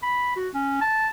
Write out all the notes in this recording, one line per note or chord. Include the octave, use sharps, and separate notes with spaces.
B5
F#4
C#4
A5